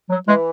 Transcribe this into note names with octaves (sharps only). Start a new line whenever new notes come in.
F#3
E3 G#3